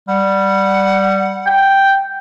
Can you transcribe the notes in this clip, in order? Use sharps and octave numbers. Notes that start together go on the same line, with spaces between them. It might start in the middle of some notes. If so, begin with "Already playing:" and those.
G3 F#5
G5